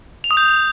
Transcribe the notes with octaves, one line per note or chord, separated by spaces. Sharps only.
F7
D#6
G6